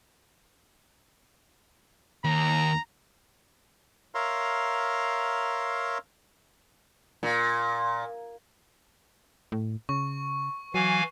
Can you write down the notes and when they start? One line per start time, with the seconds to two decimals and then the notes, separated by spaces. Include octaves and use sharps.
2.24 D#2 A#5
4.15 A#4 C#5 E5 F5 A#5 C6
7.23 A#2
9.52 A2
9.89 C#3 C#6
10.74 E3 F#3 F5 G#5